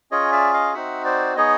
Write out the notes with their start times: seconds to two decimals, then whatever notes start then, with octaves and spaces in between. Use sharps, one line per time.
0.11 C#4 F4 G#4 C#5 D#5
0.32 D5 E5
0.54 D#5 F5
0.73 C4 D#4 F#4 E5 F#5
1.05 C5 D5
1.36 B3 D#4 G#4 C#5 D#5